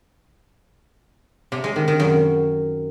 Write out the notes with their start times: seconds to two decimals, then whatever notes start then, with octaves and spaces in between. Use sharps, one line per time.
1.52 C3
1.64 G#3
1.76 D#3
1.88 D#3
2.00 F#2